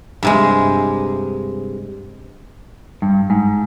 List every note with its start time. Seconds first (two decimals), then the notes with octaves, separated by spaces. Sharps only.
0.23 G2 C3 G#3
3.02 G2
3.30 G#2